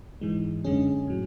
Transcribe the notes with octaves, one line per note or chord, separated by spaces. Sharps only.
G#2 E3 G#3
F#2 D3 G#3 C#4 G#4
A2 F#3